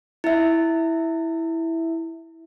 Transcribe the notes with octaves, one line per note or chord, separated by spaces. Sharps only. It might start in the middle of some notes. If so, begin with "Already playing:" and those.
E4 E5